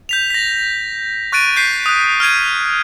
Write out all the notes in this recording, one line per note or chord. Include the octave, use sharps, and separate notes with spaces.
G6 B6 F7
A#6 B6
C#6 F#6 A6 D7 D#7
G6 B6 C7
D#6 F#6
F6 G6 G#6 D#7